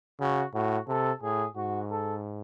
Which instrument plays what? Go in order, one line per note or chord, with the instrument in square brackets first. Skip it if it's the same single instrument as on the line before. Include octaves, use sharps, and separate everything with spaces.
[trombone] C#3 [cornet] F#4
[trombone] A2 [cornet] F#4
[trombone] C3 [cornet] A4
[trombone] A2 [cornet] G#4
[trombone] G#2 [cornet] F#4
[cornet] A4